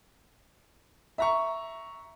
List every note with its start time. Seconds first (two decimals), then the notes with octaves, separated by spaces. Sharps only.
1.18 E5 A#5 C#6